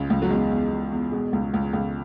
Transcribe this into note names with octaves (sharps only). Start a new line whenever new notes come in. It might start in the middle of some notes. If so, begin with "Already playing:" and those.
Already playing: C#2 C#3 G#3
C#2
F#3
E2 G#3
E2
E2
E2
B2 G#3
C#2
C#2
C#2